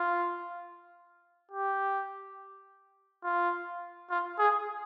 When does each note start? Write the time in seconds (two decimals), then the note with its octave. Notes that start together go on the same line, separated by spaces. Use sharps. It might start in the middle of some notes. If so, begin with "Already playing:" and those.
Already playing: F4
1.51 G4
3.24 F4
4.10 F4
4.39 G#4